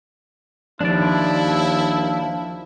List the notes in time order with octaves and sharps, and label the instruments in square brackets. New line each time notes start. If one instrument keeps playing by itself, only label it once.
[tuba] D#2 [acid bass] F3 [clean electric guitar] D4 D5 [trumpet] E4